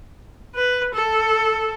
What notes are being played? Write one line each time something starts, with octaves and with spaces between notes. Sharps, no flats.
B4
A4